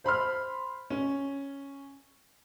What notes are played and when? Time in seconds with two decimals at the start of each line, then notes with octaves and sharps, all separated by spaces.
0.04 C5 B5 C6 F6
0.90 C#4